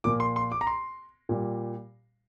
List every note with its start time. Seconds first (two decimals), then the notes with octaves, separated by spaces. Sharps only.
0.04 A#2 F3 A#3 D6
0.20 C6
0.36 C6
0.52 D6
0.61 A#5
0.67 C6
1.29 A#2 G3